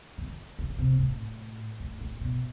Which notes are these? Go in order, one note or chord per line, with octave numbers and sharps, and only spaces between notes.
D#3
C#3
C3
A2
A2
A2
B2